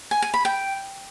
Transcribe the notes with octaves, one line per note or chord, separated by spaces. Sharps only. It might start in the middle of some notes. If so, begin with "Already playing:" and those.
G#5
G#5
B5
G5